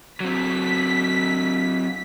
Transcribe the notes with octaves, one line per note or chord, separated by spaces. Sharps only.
F#3 C4 B6